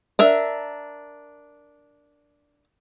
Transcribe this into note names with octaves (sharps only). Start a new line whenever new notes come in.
D4 A#4 E5